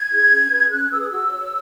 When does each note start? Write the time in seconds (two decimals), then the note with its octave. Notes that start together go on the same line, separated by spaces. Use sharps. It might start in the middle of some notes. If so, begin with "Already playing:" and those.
Already playing: G#6
0.11 E4 G#4
0.31 C#4
0.51 G#4 B4
0.71 C#4 F#6
0.91 G#4 B4 E6
1.00 D#6
1.09 F#4 E6
1.30 C#5